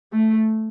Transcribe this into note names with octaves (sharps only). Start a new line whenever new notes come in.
A3